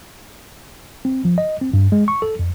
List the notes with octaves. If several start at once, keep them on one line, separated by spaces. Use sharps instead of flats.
C4
F3
D#5
C4
G2
G#3
C#6
A4
F2